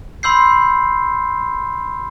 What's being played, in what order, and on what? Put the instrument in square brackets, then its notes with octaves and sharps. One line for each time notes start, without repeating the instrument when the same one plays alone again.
[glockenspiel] B5 C6 E6 G6 C7